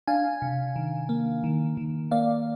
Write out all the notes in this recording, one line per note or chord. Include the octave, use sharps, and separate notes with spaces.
D4 F5 G#5
C3
D#3
A#3
D#3
D#3
A#3 D5 F5